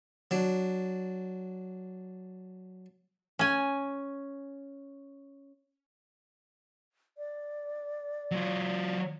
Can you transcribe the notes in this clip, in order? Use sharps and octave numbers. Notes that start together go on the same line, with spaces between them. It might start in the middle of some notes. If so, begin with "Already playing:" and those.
F#3 D4
C#4 G#5
D5
F#3 F4